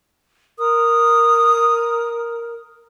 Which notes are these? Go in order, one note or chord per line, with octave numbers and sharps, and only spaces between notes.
A#4 D#6